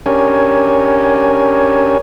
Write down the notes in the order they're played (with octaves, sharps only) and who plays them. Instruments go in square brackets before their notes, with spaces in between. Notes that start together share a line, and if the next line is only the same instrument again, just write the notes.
[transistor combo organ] C#4 D4 G4 A#4 C#5 G#5